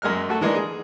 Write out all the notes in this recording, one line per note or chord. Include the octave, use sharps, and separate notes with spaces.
F#2 G#3 A#3 F6
A3 F#4 A4
E3 G#3 A#3 D4 D#4
G#4